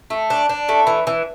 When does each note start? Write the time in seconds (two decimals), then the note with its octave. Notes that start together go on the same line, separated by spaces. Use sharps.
0.10 A3
0.30 D4
0.49 D4
0.69 A3
0.87 E3
1.07 E3